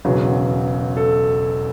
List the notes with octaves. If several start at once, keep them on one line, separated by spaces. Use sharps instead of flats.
E1 E2 C#3 F#3
A4